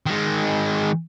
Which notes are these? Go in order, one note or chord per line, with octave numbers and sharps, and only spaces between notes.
D#3 G#3